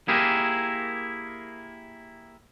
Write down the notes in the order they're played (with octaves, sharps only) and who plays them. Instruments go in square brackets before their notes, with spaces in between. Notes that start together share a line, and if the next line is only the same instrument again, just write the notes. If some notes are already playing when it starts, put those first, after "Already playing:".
[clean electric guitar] A#3 E4 G4 G#4 A#4 C5